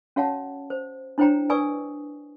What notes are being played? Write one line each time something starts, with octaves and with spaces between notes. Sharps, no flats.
C#4 F#4 C#5 F5 F#5 A5
C5
D4 E4 C5 C#5 G5 A#5
B4 D5 G#5 C#6 D#6 E6